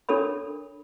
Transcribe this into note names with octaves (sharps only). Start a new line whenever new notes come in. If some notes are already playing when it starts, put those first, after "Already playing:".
D4 A4 A#4 C#5 B5